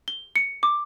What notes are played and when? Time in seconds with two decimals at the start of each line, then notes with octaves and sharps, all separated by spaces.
0.08 G7
0.36 C#7
0.63 D6